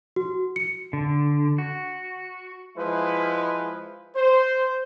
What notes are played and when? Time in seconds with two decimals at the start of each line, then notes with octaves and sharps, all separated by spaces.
0.16 F#4
0.56 C#7
0.93 D3
1.58 F#4
2.76 F3 G#3 E4 B4
4.16 C5